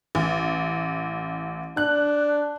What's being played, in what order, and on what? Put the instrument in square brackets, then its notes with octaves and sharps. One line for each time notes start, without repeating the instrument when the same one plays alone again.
[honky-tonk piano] A1
[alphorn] D4 [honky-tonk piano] F#6